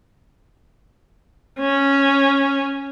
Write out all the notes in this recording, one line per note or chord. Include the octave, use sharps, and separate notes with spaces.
C#4